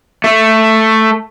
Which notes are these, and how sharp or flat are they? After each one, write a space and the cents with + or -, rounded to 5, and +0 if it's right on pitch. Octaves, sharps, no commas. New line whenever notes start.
A3 +5